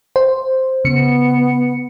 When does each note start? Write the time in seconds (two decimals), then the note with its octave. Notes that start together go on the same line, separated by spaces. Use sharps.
0.16 C5
0.85 C#3 B3 C#7